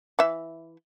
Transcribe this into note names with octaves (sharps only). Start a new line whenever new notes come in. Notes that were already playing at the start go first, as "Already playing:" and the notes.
E3 E5